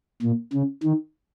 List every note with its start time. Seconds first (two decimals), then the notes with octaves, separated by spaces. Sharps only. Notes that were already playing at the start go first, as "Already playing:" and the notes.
0.23 A#2
0.53 C#3
0.83 D#3